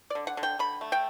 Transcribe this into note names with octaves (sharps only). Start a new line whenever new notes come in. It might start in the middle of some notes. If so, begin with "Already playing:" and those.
D3 D5
F#5
D3
G5
D3 B5
A3
G5